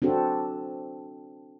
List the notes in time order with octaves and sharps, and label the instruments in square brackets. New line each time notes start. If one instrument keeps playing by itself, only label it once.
[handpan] C4 D4 F#4 A4